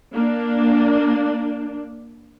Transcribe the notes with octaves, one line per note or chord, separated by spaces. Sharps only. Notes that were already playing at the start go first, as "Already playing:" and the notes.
A#3 D4